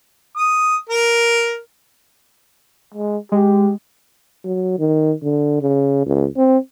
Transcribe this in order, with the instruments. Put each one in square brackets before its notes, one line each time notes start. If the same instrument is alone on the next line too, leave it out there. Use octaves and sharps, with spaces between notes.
[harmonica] D#6
A#4
[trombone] G#3
[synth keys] G#3 [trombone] G4
[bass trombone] F#3
D#3
D3
C#3
C#2
C4